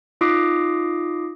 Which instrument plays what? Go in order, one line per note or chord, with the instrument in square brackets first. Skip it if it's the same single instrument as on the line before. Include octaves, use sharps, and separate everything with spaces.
[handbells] D#4 F4 D6 D#6 A#6 C7